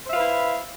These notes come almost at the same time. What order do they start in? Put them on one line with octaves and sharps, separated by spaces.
C5 E5 F5 B4 E4